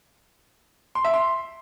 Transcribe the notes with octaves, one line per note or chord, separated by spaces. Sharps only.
C6
E5
C6